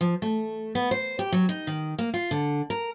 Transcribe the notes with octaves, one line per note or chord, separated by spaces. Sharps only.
F3
A3
B3
C5
G4
F#3
D#4
D#3
A#3
F4
D3
A#4